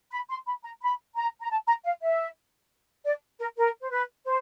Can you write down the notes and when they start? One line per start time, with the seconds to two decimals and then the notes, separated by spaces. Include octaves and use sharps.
0.12 B5
0.30 C6
0.47 B5
0.63 A#5
0.81 B5
1.15 A#5
1.40 A#5
1.51 A5
1.67 A#5
1.85 F5
2.01 E5
3.05 D5
3.39 A#4
3.57 A#4
3.81 C5
3.90 B4
4.26 C5